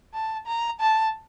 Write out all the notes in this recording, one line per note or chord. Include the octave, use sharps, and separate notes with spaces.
A5
A#5
A5